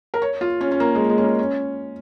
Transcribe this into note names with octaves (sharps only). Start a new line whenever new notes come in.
A#4
C#5
F4
C#4
C#4
A#3
G#3
G#3
C#4
A#3
C#4